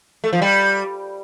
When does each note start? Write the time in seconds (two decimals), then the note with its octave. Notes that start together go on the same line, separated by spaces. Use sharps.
0.24 A3
0.33 F3
0.42 G3